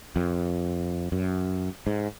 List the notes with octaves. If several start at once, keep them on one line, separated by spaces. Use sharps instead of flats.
F2
F#2
G#2